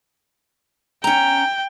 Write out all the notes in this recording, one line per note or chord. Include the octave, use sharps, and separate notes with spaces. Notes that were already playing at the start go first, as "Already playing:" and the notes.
C#4 G5 A#5